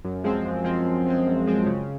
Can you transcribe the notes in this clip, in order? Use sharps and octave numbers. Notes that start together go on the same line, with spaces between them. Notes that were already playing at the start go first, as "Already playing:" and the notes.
F#2
F3 G#3 C4
F#2
F3 G#3 C4
F#2
F3 G#3 C4
F#2
F3 G#3 C4
C#3